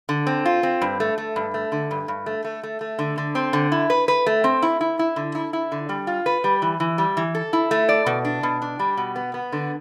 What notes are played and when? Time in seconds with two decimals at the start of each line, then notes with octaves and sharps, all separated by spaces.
0.09 D3
0.27 C4
0.45 F4
0.63 C4
0.82 G2
1.00 A3
1.18 A3
1.36 G2
1.54 A3
1.72 D3
1.91 G2
2.08 G2
2.26 A3
2.44 A3
2.63 A3
2.81 A3
2.99 D3
3.18 D3
3.35 C4
3.53 D3
3.72 E4
3.90 B4
4.08 B4
4.26 A3
4.44 C4
4.62 E4
4.81 E4
4.99 E4
5.16 D3
5.35 E4
5.53 E4
5.72 D3
5.89 G3
6.07 F4
6.26 B4
6.44 G3
6.62 E3
6.80 E3
6.98 G3
7.17 E3
7.35 A4
7.53 E4
7.71 A3
7.89 D5
8.06 B2
8.25 D4
8.43 B2
8.62 D4
8.79 G3
8.97 B2
9.16 B3
9.34 B3
9.52 D3